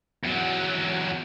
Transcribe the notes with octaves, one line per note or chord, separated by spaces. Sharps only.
E2 F#3